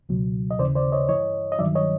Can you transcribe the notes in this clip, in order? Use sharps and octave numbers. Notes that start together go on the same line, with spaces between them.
C#2 B2 F#3
D#5
D#2 C#3 E3 C5 D5
C5 D5
C#5 D#5
G2 E3 C#5 D#5
D#5
G2 D#3 F#3 D5 E5
C#5 D#5